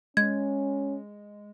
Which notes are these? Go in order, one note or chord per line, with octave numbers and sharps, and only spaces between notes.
G#3 C#4 G#6